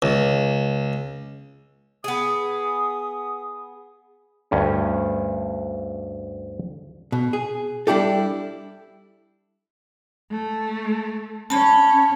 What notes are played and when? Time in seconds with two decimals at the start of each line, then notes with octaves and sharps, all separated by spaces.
0.02 C#2
2.04 B3 G#4 D#6
4.51 D2 G2 C#4
7.12 B2
7.33 G#4
7.87 G3 D4 E4 G4 A4
10.31 A3
11.50 C#4 A5 B5